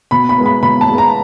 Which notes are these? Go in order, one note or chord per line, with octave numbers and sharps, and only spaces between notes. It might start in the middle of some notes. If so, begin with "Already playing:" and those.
B2 B5
B5
G#3 B3
B5
B2 B5
A5
G#3 B3
A#5